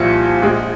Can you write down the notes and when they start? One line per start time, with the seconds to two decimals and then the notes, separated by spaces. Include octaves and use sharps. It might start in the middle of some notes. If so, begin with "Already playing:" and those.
Already playing: C2 A#2 F3 C4 C#7
0.42 A#1 A#2 G#3